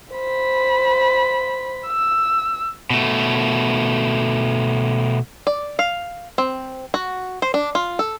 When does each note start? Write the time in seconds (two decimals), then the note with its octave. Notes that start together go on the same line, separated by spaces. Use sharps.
0.14 C5 B5
1.88 E6
2.90 B2 A3
5.47 D5
5.79 F5
6.38 C4
6.94 F#4
7.42 C5
7.54 D4
7.75 F4
7.99 A4